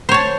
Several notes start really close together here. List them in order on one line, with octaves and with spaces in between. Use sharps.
C5 C#5 A5